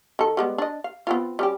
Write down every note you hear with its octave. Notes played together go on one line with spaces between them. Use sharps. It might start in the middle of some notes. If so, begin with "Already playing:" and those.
D#3 A4
G3 G#3 B3
D4 D#5
F5
B3 C4 F4
G3 C#4 G4